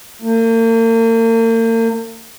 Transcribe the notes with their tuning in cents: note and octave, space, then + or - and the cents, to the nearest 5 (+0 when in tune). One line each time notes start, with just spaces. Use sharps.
A#3 -40